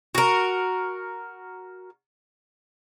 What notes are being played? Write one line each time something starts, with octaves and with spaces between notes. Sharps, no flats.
F#4 A#4